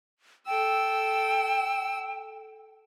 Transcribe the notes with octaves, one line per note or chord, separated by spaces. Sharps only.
A4 G5 E6